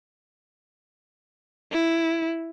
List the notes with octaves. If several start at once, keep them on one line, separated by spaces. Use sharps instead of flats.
E4